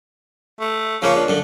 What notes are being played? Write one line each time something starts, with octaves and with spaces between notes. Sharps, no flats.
A3
C#3 F3 A#3 C#5
D4
F#2 D3